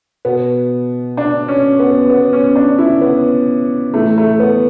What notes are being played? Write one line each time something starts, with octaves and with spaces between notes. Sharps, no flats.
B2 B3
D4
C#4
B3
B3
C#4
D4
E4
B3
A2 E3 A3
A3
B3